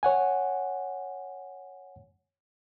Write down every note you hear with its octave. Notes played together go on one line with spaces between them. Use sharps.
C#5 F#5 G#5